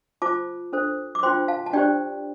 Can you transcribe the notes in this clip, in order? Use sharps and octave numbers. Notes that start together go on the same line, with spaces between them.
F4 C5 A5 D6
D4 A4 C5
D6
D4 F4 C5 G5 C6
F5 A5
A5
D4 G4 C5 D5 G5